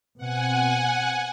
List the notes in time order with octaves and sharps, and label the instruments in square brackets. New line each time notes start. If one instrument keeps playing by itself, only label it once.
[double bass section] B2 C4 [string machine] F#5 G#5